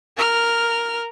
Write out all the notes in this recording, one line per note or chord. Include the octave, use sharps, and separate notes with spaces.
A#4 F6